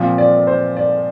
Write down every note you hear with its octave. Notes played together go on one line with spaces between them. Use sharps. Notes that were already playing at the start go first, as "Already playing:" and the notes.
Already playing: A#2 F3 C4
D5
C5
D5